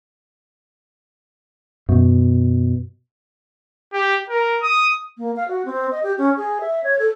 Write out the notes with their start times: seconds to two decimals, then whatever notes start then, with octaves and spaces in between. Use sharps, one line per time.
1.89 F#2 B2
3.93 G4
4.29 A#4
4.62 D#6
5.18 A#3
5.36 F5
5.48 F#4
5.65 C4
5.91 D#5
6.03 G4
6.18 C#4
6.37 G#4
6.61 E5
6.84 C#5
6.99 A4